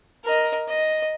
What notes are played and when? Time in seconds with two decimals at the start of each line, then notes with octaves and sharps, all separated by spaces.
0.24 A#4 D#5
0.68 D#5